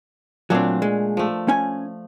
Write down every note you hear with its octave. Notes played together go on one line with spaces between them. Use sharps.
A#2 F#3 A3 C4 D4
G#3
F3 A3
C#4 G#5